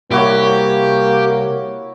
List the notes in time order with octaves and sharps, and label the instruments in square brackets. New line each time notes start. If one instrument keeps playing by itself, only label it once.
[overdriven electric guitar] C2 [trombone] A#3 [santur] E4 F#4 C#5 [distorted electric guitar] G4